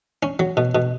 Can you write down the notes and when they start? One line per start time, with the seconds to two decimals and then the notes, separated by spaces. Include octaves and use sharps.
0.23 C#4
0.39 F#3
0.57 B2
0.75 B2